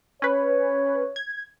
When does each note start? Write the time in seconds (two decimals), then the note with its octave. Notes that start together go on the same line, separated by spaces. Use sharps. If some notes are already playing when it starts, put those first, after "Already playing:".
0.22 C#4 B4 C#5
1.16 G#6